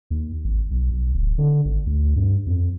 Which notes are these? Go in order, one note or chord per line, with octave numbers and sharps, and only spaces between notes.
D#2
G#1
B1
B1
D1
D3
G#1
D2
G2
F2